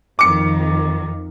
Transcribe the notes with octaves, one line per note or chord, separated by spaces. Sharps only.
F2 D#3 D6 C#7